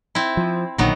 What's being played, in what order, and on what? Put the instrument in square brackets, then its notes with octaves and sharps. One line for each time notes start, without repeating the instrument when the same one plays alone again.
[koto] C4 E4
[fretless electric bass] F3
[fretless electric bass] A#1 A#2 D3 [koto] D#3 F#3 B3